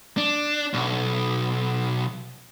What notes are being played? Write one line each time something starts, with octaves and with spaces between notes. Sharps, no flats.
D4
B1